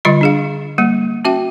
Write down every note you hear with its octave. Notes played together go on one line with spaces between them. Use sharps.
D3 G3 F4 D#5 B5
D4 G#4 F5
G3 A#3
C#4 F#4 E5 G5